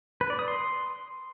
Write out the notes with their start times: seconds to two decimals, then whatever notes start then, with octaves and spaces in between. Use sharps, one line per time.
0.21 B4
0.30 D5
0.39 D#6
0.48 C6